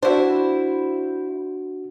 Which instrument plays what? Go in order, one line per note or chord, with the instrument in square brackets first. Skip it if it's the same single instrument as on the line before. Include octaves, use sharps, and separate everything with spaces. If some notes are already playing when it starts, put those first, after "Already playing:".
[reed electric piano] D4 F#4 [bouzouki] E4 C5